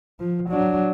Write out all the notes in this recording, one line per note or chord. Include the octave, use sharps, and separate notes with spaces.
F3
F#3 D4